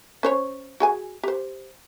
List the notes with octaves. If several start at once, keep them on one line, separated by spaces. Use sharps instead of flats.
C#4 C5 C#5
F#4 G#4 G#5
G4 C5